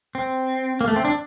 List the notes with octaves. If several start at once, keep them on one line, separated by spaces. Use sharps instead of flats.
C4
A#3
A3
C4
D4